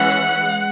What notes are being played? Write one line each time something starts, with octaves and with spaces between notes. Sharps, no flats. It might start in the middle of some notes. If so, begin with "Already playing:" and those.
Already playing: E3 G#3 C#4 F#5
G#3